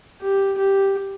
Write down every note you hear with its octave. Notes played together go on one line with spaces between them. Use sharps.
G4
G4